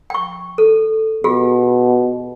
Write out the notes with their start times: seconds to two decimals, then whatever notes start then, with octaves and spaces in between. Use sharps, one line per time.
0.10 G5 C#6
0.58 A4
1.24 B2 F4 G4 G#4